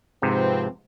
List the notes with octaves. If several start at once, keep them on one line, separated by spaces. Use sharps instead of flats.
G#2 C3 F3 C4 B4